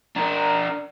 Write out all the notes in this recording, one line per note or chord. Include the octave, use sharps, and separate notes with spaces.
D4 A#4